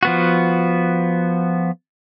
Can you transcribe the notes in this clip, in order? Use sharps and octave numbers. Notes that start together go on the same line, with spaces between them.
F3 B3 F#4